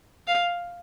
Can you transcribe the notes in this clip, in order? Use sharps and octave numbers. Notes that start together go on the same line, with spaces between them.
F5